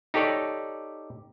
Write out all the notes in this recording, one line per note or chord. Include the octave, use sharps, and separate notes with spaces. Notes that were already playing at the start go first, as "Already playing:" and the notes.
D#4 G4 A4 C#5 D5